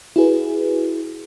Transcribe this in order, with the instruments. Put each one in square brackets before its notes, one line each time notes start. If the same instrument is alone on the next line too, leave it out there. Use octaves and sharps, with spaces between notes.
[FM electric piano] E4 F#4 G#4 B4